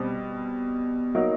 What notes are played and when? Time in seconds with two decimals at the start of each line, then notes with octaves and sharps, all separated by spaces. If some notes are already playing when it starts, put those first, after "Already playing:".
Already playing: B2 G3 C4
1.15 F#3 A#3 D#4 F#4 A#4